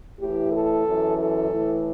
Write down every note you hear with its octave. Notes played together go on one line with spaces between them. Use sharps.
A2 E3 G4
A4
F#2 E3
A4
A2 E3